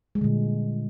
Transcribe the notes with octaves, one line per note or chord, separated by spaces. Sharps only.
A#2 D3 G3 G#3